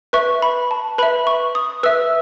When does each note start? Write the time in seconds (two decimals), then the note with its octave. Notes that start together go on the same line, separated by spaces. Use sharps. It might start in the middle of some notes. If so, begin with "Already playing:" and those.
0.13 B4 E5 C#6
0.42 B5
0.71 A5
0.98 B4 E5 B5
1.27 C#6
1.55 D#6
1.83 B4 E5 E6